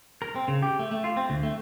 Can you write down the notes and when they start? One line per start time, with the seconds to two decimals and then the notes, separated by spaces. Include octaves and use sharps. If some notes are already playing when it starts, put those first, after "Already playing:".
0.22 A#4
0.36 C4
0.48 C#3
0.63 G4
0.79 A3
0.91 A3
1.04 F4
1.17 C4
1.30 D2
1.43 A3